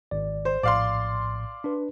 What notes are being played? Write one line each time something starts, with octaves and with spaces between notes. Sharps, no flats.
G#1 D5
C5
A#1 A2 D5 F5 C6
D4 B4